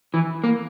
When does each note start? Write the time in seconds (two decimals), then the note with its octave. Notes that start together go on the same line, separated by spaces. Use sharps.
0.14 E3
0.44 A#3